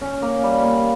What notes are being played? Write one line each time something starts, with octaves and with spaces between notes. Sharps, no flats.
C#4
A#3
G3
A#3